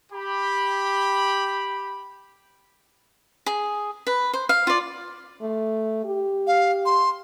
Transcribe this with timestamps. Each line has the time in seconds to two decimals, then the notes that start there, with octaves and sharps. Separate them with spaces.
0.12 G4 B5
3.46 G#4
4.07 B4
4.33 C5
4.49 F5
4.67 F4 D5
5.41 A3
6.05 G4
6.47 F5
6.86 C6